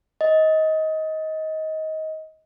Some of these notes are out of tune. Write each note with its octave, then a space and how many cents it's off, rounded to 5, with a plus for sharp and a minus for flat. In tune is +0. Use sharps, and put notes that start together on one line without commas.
D#5 +20